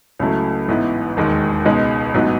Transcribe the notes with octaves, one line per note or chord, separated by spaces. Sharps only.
C#2 C#3 F#3 A3 E4
A1 G#2 E3 B3 E4
E1 D#2 D#3 G#3
C#2 B2 G#3 D#4
A1 G#2 F#3 B3